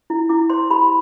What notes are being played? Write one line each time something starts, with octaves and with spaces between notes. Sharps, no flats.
E4
E4 D6
C5 C6
G4 B5